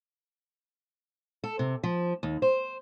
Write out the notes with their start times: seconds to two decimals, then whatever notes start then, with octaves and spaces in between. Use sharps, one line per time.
1.44 A4
1.59 C3
1.83 F3
2.23 D#2
2.42 C5